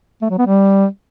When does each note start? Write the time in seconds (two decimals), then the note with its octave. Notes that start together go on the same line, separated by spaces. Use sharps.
0.22 A3
0.30 F#3
0.38 B3
0.47 G3